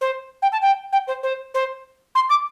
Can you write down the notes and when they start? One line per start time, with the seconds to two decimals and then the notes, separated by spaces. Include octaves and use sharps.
0.01 C5
0.42 G5
0.52 A5
0.62 G5
0.92 G5
1.07 C5
1.23 C5
1.54 C5
2.15 C6
2.29 D6